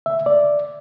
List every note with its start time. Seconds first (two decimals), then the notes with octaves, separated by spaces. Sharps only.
0.06 E5
0.26 D5